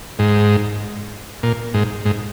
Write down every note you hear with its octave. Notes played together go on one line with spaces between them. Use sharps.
G#2
A#2
G#2
G#2